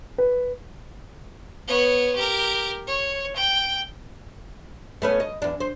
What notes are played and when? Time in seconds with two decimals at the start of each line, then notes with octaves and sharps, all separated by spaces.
0.18 B4
1.68 B3 C#5
2.15 G4 A#4
2.87 C#5
3.35 G5
5.02 A3 B3 C#4
5.20 D#5
5.42 E2 D4
5.60 C5